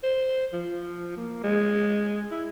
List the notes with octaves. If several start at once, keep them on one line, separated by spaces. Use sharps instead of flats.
C5
F3
A#3
G#3
E4